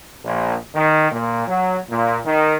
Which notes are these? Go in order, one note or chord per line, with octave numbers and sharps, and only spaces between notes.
A#1
D#3
A#2
F#3
A#2
D#3